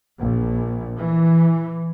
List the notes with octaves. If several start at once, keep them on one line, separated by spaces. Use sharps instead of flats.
A#1
E3